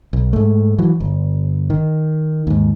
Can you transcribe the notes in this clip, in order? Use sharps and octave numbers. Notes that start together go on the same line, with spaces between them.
B1
G#2 A3
E3 F#3
G1
D#3
D#2 G#2